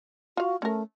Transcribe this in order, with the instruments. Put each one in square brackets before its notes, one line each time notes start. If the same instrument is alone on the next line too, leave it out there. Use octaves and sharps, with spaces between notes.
[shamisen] F4 F5 [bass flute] F#4
[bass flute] A3 [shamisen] C#4 A#4